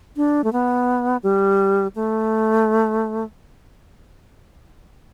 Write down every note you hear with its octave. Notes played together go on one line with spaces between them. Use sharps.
D4
A3
B3
G3
A3